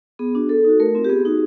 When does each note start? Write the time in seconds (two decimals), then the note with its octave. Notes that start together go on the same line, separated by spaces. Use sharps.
0.19 B3 G#4
0.35 D4 F#4
0.49 B3 A4
0.64 D#4 F#4
0.80 A3 A#4
0.95 C4 F4
1.05 G4
1.09 B3 G#4
1.25 D#4 F#4